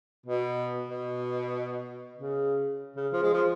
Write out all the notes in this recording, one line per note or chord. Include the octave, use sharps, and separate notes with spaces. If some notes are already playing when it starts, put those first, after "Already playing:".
B2
B2
C#3
C#3
F3
G#3
F3